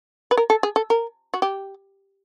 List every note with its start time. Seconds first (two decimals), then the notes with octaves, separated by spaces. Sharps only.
0.31 B4
0.37 A#4
0.50 A4
0.63 G#4
0.76 A4
0.90 A#4
1.34 F#4
1.42 G4